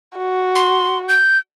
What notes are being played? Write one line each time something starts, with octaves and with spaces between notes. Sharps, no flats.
F#4
C6
G6